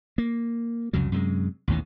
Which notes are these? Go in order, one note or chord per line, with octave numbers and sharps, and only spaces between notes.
A#3
C2 F2 C#3 F#3
F#2 C3 F#3 G#3
A1 D#2 B2 D#3